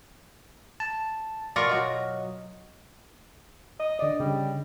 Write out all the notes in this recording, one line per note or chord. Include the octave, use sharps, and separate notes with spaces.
A5
B2 F4 A#4 D5 C#6
F#3 F#4 D#5
D#5
D3 D5 D#5
C#3 G3